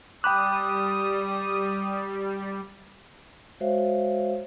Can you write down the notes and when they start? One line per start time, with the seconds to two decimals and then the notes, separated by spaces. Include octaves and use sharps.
0.24 G3 G5 B5 D6 D#6 F#6
3.60 G#3 F#4 C5 C#5 E5 F5